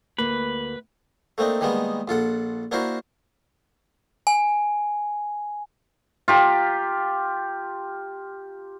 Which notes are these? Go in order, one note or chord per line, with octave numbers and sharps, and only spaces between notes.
D2 A#3 B4
A3 A#3 C4 D4 D#4
D#3 G3 G#3 A#3 B3
A#1 F4 A4 F#5
A#3 D4 E4 F#4 A#4 C5
G#5
F4 G4 A#5